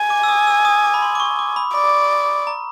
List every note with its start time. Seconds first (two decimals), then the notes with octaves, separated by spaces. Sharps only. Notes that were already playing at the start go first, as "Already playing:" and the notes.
Already playing: G#5
0.10 D6
0.23 E6
0.29 D#6
0.47 E6
0.65 D#6
0.84 D6
0.94 B5
1.02 C6
1.15 D6
1.20 C#6
1.39 D6
1.56 B5
1.75 D5 B5
2.47 A#5